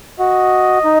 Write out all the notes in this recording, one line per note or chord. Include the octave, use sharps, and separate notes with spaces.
F#4 D#5
D#4